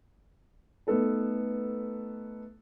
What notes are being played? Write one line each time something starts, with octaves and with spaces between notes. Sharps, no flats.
A3 B3 D#4 A4 B4